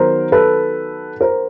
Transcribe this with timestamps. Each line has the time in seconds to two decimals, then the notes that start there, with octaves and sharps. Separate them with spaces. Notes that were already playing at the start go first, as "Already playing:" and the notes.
Already playing: D#3 F#3 B3 A#4 C5
0.32 A4 B4
1.21 A#4 C5